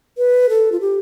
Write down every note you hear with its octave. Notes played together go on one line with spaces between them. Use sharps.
B4
A4
F4
G4